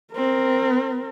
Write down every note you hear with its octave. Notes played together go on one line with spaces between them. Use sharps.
C4 A#4